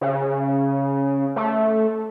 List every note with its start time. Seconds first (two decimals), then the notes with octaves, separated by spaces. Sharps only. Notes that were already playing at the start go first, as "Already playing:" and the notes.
0.01 C#3
1.36 A3